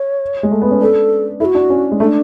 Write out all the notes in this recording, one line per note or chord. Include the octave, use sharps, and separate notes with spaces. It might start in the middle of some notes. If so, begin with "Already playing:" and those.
Already playing: C#5
G#3
A3
B3
C#4
D4 A4
E4 A4
F#4
D4
C#4
G#3
A3 D4